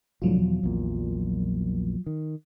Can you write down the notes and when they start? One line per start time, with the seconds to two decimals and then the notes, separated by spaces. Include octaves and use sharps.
0.22 C2 A2 D3 F3 F#3 F4
0.37 E2 B2
0.63 A#1 E2 A#2
2.06 D#3